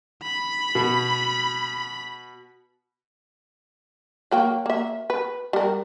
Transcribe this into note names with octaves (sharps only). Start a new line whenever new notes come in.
B5
B2
F#3 A#3 G5
A#3 E5
B4
G3 A#4